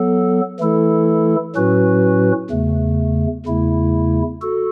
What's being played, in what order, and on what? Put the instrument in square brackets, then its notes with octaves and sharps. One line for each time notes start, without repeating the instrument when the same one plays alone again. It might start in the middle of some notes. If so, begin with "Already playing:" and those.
Already playing: [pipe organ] F#3 B3 A4
E3 A3 E4 A4
A2 F#3 C#4 F#4 B4
E2 C#3 A3
E2 C#3 A3 E4
F#4 A4